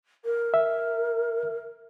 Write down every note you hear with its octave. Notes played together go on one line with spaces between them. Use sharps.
A#4
E5